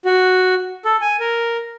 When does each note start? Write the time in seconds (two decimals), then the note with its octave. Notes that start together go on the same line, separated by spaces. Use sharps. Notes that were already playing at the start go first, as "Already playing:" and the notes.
0.05 F#4
0.85 A4
1.01 G#5
1.20 A#4